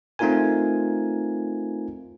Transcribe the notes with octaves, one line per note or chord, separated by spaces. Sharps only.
A3 C4 D#4 F4 A#4 G#5